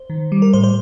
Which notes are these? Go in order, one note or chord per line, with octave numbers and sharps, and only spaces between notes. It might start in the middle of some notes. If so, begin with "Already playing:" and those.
Already playing: C5
D#3
G3
A#4
A2 C5
C5